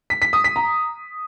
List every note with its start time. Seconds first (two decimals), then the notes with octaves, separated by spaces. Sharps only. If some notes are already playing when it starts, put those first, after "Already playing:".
0.10 B6
0.22 B6
0.33 D#6
0.44 B6
0.56 A#5